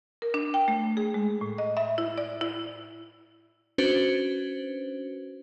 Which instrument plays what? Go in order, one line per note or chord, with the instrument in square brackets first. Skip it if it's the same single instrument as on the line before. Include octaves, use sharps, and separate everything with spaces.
[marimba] A#4
D4
G5
A3
G#4
G#3
A2
D#5
E5
E4
D5
E4
[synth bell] C#4 D4 F#4 B4 C5